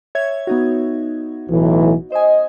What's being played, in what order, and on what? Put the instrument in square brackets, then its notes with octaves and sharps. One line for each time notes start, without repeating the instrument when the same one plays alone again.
[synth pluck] C#5 E5 G#6
B3 D#4 F#4
[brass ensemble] B1 A2 E3
[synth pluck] C5 G#5 [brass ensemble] D#5